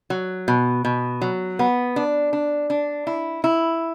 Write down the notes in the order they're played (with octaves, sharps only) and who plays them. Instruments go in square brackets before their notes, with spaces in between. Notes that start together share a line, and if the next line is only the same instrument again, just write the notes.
[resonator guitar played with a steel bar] F#3
B2
B2
F#3
B3
D4
D4
D4
E4
E4